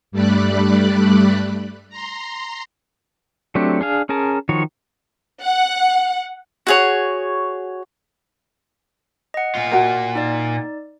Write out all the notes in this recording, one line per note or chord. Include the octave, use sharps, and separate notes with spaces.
G2 G3 A3 D5 B5 F#6
A#5 C6
F#3 A3 C4 D4 G4
D4 G#4 F5
C#4 G#4 A#4 A5
D#3 F3 F#4 C#5
F#5
F#4 G#4 C#5
D#5 F#5
A#2 F4
F#4 A#4
D#4 D5